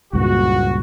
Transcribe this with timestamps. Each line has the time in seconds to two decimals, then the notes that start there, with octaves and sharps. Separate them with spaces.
0.13 F#1 C#2 G2 A#2 F#4